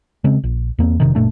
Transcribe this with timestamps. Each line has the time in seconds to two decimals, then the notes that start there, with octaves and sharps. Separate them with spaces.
0.24 C#3 G#3 C4
0.44 A#1
0.79 E2 A#3 C4
1.00 F1 C3 D#3
1.15 F#1 A#2 A3 D4